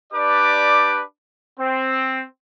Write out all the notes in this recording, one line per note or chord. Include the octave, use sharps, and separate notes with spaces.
D4 G4 B4 D5 D6
C4